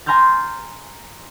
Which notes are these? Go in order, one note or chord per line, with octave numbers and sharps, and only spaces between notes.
G#5 A#5 C6 F6 G6 A6